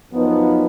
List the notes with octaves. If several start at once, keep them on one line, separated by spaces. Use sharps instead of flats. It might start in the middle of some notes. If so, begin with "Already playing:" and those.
F#2 F3 B3 D#4